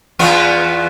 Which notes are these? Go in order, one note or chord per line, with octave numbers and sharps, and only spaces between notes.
E2 B3 F4